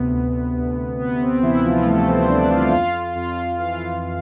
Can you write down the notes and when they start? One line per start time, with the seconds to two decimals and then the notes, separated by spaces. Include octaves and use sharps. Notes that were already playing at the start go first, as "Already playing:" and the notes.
Already playing: D2 C3 B3
0.12 D2
0.56 D2
0.99 C3 B3
1.21 C4
1.42 C3 E3 E4
1.64 F3 F4
1.85 G3 A3 A4
2.07 C4 C5
2.29 D2 D4 D5
2.50 F4 F5
2.71 F2 F4 F5
3.15 F2 F4 F5
3.58 E3 F4 F5